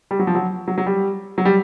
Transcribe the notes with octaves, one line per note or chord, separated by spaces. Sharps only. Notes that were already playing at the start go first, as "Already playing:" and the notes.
G3
F#3
F3
F#3
F#3
F#3
G3
F#3
G3